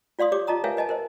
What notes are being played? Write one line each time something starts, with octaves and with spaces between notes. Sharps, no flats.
F4 D5 F5 C6 D#6
G4 C#5 D6
F4 D#5 A5 A#5 D#6
A#4 B4 C#5 E5 F5 G#5
B4 D#5 G#5 A5
A#4 C5 D#5